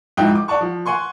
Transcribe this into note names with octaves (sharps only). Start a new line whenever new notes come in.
G#2 F3 E4 G5
D6
D5 F#5 A5 C#6
F3
F#5 G#5 C6 C#6